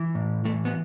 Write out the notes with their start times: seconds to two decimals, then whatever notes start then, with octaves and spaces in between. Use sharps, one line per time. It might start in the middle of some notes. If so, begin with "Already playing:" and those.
Already playing: E3
0.15 A2
0.45 E3 A3
0.65 B3